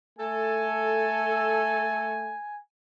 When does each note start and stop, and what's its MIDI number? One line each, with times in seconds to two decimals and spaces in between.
0.18 2.35 57
0.18 2.15 69
0.18 2.59 80